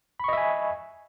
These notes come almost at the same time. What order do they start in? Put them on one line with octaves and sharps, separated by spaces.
B5 C#6 D#5 E5 G#5